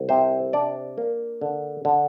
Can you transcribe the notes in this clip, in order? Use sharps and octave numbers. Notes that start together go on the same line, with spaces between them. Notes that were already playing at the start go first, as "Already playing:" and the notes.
Already playing: C2
C3 C5
D4 D5
A#3
D3
D3